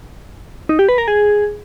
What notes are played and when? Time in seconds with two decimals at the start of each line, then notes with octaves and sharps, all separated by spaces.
0.69 D#4
0.79 G4
0.89 B4
0.98 A#4
1.08 G#4